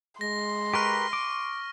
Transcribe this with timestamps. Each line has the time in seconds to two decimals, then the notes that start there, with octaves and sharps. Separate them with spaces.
0.21 G#3 C6 A#6
0.74 G4 A#4 B4 C#6 F6
1.13 D6